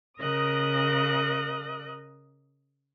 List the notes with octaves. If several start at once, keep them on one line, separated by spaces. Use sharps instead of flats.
C#3 A#4 D#5 D#6 F#6